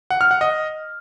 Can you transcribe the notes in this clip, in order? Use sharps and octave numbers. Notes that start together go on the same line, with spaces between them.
F#5
F6
F#5
D#5